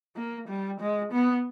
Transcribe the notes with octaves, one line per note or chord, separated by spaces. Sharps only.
A#3
G3
G#3
B3